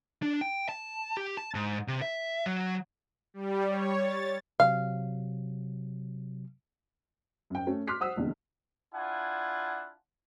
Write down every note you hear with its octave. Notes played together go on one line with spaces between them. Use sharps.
D4
G5
A5
G4
A5
G#2
C3
E5
F#3
G3
C#5
A6
C3 F#3 F5
F#2 G5
A3 C#4
C6 D6 F6 F#6 B6 C7
C5 F#5 D#6 E6
F1 A#1 E2 D3
D4 E4 F4 F#5 G#5